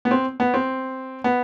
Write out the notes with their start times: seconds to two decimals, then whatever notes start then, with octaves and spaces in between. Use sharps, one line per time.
0.05 B3
0.11 C4
0.40 B3
0.54 C4
1.24 B3